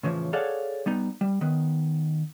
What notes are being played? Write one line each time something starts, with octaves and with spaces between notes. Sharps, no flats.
A2 C#3 E3 F3
G#4 A4 C#5 D5 F5 F#5
G3 B3 D#4
G3
D#3 B3